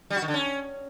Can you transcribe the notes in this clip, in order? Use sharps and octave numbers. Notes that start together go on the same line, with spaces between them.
G3
F#4
D#3
D3
C#4